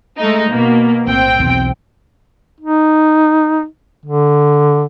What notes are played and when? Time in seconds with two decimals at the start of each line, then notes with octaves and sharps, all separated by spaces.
0.18 G#3 A3 D#4
0.49 B2 A#3
1.06 B1 A2 C4 G5
1.39 B1 E2
2.60 D#4
4.06 D3